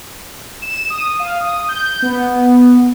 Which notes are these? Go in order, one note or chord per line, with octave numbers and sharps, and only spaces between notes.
E7
D#6
F5
D#6
G6
B3